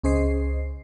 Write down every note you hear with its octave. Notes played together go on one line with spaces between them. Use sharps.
C#2 C#4 G#4 C5 D#5 C7